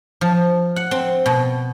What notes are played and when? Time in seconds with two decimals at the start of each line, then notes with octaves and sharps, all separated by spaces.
0.21 F3
0.76 F#5
0.91 C4
1.26 B2